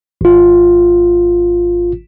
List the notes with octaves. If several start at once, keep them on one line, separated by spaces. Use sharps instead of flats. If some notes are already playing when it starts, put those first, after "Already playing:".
G#1 F4